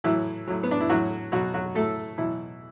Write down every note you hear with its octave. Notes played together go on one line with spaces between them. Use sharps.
A2 E3 F#3 E4
A2 F#3
B3
D4
E4
A2 E3 F#3 F#4
B2 F#3 F#4
F#3 F#4
A2 F#3 A3 A4
B2 E3 F#3 E4